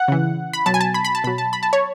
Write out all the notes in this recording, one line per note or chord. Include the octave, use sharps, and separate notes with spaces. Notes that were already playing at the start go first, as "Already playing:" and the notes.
Already playing: F#5
C#3 E3
B5
B2 F#3 A5
G#5
A5
B5
B5
A5
B2 F#3 B5
A5
B5
A5
C#5